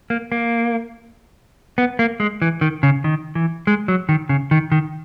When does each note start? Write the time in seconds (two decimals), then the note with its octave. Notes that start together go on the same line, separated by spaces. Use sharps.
0.10 A#3
0.32 A#3
1.78 B3
1.99 A#3
2.20 G#3
2.42 E3
2.61 D#3
2.83 C#3
3.04 D#3
3.35 E3
3.67 G#3
3.88 F#3
4.09 D#3
4.29 C#3
4.51 D#3
4.72 D#3